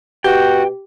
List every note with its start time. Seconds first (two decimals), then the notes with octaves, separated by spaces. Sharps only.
0.24 B2 F#4 G4 G5